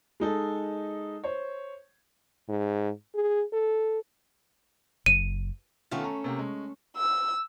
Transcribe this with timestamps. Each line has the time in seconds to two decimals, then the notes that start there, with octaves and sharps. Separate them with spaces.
0.20 G#3 D#4 A4
1.24 C5 C#5
2.48 G#2
3.14 G#4
3.53 A4
5.06 F#1 D#7
5.91 D#3 A3 B3 C#4 F4
6.04 A#5
6.24 C3 A#3 G4
6.39 G#3
6.97 E6